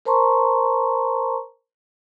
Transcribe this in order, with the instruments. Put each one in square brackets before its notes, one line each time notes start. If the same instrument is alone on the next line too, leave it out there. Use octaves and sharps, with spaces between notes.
[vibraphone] A#4 C5 A5 A#5 C6 C#6